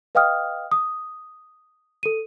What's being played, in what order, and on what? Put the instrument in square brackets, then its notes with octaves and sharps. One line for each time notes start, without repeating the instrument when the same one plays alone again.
[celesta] B4 D#5 F5 G5 D#6 F6
D#6
A4 D#7